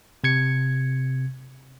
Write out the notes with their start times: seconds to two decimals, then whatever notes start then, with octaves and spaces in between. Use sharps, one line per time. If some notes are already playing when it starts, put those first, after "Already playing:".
0.24 C3 G#6 C#7